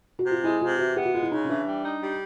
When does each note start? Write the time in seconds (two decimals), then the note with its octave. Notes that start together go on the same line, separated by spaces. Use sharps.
0.19 F#4
0.26 C3 F4
0.43 G#3 E4
0.61 C3 F4
0.79 E3 F#4
0.96 B3 G4
1.05 F#4
1.13 G#3 F4
1.23 E4
1.31 C#3 D#4
1.45 C#4
1.49 E3 D4
1.67 G3
1.84 D#4
2.02 G3